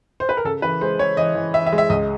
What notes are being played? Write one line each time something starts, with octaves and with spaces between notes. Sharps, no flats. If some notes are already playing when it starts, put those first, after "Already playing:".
C5
B4
A#4
C#3 A4
E3 B4
G#3 C5
G#3 C#5
E3 D#5
E3
E3 E5
E5
G#3
E5
C#2 D#5